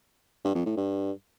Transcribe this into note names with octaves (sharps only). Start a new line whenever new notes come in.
G2
F2
A2
G2